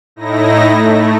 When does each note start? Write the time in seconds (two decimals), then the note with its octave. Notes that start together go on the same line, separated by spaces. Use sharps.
0.16 A2 D#4 E4 A#6
0.70 A3